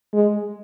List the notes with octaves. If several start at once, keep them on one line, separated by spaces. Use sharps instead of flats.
G#3